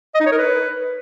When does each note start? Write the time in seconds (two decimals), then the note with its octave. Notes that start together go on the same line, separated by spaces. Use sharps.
0.15 D#5
0.20 D#4
0.26 C#5
0.32 A#4
0.38 B4